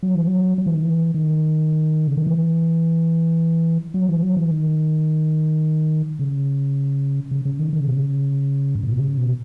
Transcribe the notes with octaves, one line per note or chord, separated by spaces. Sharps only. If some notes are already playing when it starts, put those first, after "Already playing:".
F#3
E3
F#3
F#3
E3
D#3
E3
D#3
C#3
D#3
E3
F#3
E3
F#3
E3
D#3
C#3
C#3
C#3
D#3
D#3
C#3
B2
C#3
G#2
A2
B2
C#3
B2